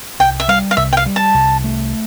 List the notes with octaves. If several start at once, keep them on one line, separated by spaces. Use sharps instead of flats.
C2 G5
E5
G3 F5
F5
C2 E5
G5
F5
G3
A5
C2
A3